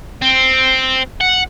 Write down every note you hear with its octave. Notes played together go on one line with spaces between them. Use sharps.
C4
F#5